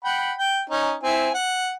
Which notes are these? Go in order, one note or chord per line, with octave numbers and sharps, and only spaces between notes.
F#5 G5 B5
G5
C#4 D#4
C4 E4 G#5
F#5